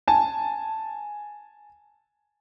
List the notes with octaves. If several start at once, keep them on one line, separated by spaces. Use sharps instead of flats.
G#5 A5